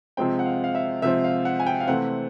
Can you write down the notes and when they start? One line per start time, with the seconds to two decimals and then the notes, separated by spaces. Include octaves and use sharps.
0.17 C3 F3 G#3 C4 G5
0.39 F#5
0.45 F5
0.64 F5
0.75 E5
1.02 C3 F3 G#3 C4 E5
1.24 F5
1.45 F#5
1.60 G#5
1.67 G5
1.80 F5
1.87 C3 E3 A3 C4 F#5